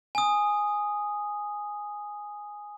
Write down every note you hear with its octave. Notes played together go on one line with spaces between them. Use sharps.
G#5 D#6